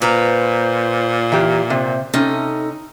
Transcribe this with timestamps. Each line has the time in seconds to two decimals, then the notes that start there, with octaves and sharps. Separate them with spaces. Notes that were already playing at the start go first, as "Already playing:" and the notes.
0.02 A#2 B4 C5 A#5
1.32 E3 A#3 G4
1.70 C3 C5
2.14 C3 C#4 D#4 A4